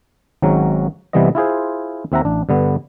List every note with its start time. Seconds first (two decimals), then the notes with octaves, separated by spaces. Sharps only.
0.42 G#1 G#2 F#3 C#4 A#5
1.13 C3 E3 G3 B3 C4 D#5
1.35 E4 F4 G#4 C5
2.12 D#2 C4 E5 F#5 A#5
2.25 A1 D4
2.49 G2 D3 B3